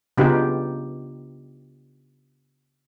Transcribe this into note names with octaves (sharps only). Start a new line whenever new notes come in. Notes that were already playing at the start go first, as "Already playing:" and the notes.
C#3 B3 D4 D#4 F4 G4